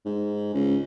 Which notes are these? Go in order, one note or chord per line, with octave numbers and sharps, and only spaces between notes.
G#2
C#2